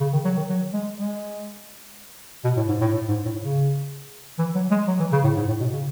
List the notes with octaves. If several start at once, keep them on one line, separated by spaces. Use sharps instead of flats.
C#3
D#3
F#3
D#3
F#3
G#3
G#3
B2
A2
G#2
A2
A2
G#2
A2
C#3
E3
F#3
G#3
F#3
E3
C#3
A2
G#2
A2
B2
C#3